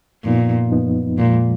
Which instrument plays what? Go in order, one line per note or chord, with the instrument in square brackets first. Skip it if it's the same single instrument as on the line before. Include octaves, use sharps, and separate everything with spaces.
[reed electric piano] F#2 F3 B3 D#4 [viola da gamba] A#2
[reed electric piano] F#2 F3 B3 D#4
[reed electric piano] F2 F3 G#3 [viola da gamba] A#2